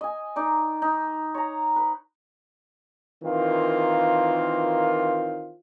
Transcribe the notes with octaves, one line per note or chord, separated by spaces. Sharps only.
D#5 G#5
D#4 D5
D#4
C#5 A#5
B4
D#3 E3 A#3 C4 F4